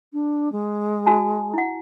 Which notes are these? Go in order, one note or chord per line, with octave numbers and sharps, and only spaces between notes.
D4
G#3
F#4 G#5 A5
E4 F#5